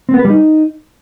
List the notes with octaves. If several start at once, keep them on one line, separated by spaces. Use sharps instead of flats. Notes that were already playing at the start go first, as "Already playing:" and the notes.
C4
B3
B4
G3
D#4